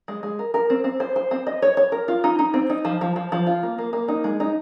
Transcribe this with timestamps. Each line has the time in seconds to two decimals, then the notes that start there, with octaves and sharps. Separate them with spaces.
0.08 G#3
0.23 G#3
0.39 A#4
0.54 A#4
0.70 C4
0.84 C4
1.00 C5
1.16 C5
1.31 C4
1.47 D#5
1.62 C#5
1.77 C#5
1.92 A#4
2.08 F4
2.24 D#4
2.39 D#4
2.54 C4
2.70 D#4
2.85 F3
3.01 F3
3.16 F3
3.32 F3
3.46 F4
3.63 A#3
3.78 A#3
3.93 A#3
4.08 D#4
4.24 G#3
4.40 D#4